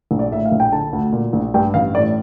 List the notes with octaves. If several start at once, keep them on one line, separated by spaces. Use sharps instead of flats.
A#1
D5
A2 E5
F5
A#1
G5
D3 A5
D2
A#2
A#1
G2 G5
A1 F5
A2 D5